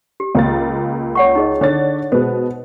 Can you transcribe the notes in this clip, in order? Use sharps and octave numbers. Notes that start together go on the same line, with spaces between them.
G4
C#2 A#3 A6
C#5 F#5 C#6
D#4 G#4 D#5
D3 C#5 A6
B2 G#3 B3 C5